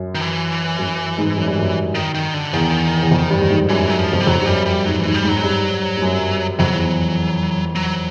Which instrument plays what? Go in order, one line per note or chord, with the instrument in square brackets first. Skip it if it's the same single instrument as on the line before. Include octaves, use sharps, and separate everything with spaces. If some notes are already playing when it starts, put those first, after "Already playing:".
Already playing: [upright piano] F#2
[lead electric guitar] D#3
E3
[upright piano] F#2
G#2
F#2
G2
F#2
[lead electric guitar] D#3
D#3
D3
[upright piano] E2 [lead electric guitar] D#3
[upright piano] E2
F2
G2
G2
G#2
[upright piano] F#2 [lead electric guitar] E3
[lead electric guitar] F#3
F3
[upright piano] F2
[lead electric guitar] G3
[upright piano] F2 [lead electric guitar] F#3
[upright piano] G2
[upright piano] F#2 [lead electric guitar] G3
[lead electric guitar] G3
[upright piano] G#2 [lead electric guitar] F#3
[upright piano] G#2 [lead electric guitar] E3
[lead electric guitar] G3
[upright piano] G#2
[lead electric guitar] F#3
[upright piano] G2
G2
F#2
[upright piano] F2 [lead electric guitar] F#3
[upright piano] E2
[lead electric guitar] F#3